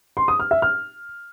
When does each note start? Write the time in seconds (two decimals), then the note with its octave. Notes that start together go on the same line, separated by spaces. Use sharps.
0.17 C6
0.28 D#6
0.40 F6
0.51 E5
0.62 F6